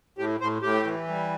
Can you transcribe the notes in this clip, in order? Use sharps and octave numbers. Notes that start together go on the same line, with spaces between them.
A2 G4
A2 C5
A2 G4
E3
G3